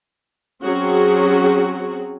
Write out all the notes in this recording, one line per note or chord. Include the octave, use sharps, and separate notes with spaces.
F#3 C4 C#4 F#4 G#4